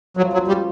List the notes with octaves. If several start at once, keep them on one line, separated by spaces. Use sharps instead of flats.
F#2 C#3 F3 F#3
F#3
G3